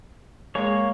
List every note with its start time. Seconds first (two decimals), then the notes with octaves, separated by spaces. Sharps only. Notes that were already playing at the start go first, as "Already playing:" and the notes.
0.55 G#3 A#3 G#4 C#5